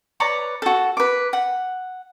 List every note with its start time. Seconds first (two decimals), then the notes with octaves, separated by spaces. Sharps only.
0.20 B4 C#5 D5 A#5
0.62 F#4 A4
0.97 B4 D6
1.33 F#5